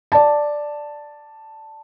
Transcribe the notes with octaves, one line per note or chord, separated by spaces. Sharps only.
D5 A5